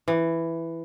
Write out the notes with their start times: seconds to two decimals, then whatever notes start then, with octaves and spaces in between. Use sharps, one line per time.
0.08 E3